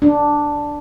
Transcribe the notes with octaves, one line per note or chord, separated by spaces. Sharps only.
D4